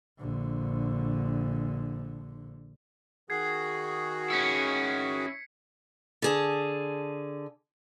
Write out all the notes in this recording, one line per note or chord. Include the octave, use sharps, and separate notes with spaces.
A#1 D3
D#3 F#4 G#4 G#6 C7
C#4 E4 B6 C#7
D3 G#4 A5